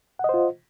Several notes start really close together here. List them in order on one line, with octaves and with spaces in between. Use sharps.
F#5 D#5 C5 F4